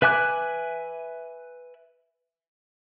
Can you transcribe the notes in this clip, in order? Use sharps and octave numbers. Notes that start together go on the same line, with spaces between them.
B4 E5 G#5 D6 F#6